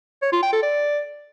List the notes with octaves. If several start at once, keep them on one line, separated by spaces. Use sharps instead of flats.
C#5
F4
G5
A4
D5